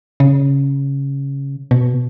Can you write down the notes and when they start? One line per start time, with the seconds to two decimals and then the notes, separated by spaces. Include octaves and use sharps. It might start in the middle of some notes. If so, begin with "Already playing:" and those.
0.20 C#3
1.71 B2